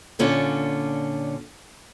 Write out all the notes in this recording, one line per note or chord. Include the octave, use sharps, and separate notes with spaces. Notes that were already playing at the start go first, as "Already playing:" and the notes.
A#2 D3 C#4 F4 A5